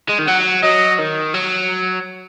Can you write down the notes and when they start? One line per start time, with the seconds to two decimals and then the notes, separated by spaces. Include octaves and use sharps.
0.09 G#3
0.18 D#3
0.27 F#3 F#5
0.63 F#3 D#5
0.99 D#3
1.34 F#3